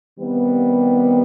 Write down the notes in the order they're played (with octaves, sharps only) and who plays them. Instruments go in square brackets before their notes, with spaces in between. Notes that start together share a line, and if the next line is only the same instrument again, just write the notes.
[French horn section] C3 D#3 G3 B3